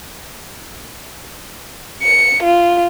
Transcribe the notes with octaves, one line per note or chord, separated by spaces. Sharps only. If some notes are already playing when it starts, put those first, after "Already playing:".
C#7
F4